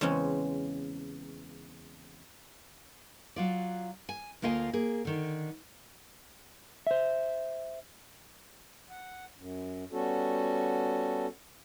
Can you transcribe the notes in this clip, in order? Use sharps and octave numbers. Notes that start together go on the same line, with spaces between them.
E2 C#3 G#3 C4 C#4
F#3 F4 D5
G#5
D2 A#3 F4 D#5 G5 G#5
A#3 G#4
D3 D#3
C5 E5
F#5
F#2
G3 B3 C#4 F#4 A4